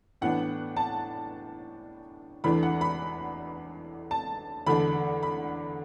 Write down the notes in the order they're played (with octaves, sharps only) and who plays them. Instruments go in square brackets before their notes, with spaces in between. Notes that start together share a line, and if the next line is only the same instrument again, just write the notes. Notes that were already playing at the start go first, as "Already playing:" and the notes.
[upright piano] A2 E3 B3 D4 F#5
A5
E2 E3 A3 D4 B5
F#5
B5
A5
E2 D3 A3 D4 B5
B5